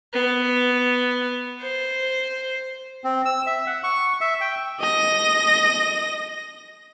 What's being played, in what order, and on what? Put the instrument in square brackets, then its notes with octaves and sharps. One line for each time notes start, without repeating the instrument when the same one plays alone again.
[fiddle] B3
C5
[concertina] C4
E6
E5
F#5
C#6
E5
G5
[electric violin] D#5 A#6